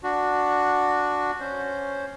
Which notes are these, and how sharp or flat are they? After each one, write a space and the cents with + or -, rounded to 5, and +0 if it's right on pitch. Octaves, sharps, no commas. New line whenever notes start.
D4 +0 F#4 -10
C#4 +0 C5 +0